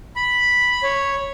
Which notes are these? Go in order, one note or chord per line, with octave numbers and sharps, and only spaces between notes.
B5
C#5